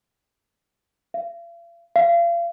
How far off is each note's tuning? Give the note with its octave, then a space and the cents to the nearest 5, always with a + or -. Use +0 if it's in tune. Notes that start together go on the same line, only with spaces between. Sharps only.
F5 -45
F5 -35